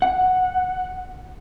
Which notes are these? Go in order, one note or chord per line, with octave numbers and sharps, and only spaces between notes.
F#5